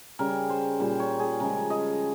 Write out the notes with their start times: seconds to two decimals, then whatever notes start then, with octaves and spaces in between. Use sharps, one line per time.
0.19 C#3 G3 A#4
0.49 C5
0.80 A#2 G3 C5
1.00 C#5
1.19 G#4
1.40 C#3 F3 G#3 A#4
1.70 D#5